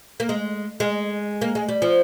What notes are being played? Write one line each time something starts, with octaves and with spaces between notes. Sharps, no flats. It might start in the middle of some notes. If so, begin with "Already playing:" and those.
A#3
G#3
G#3
A#3
G#3
G3
F3